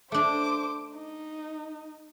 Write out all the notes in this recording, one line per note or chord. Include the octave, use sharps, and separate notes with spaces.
A3 D4 C5 D6
D#4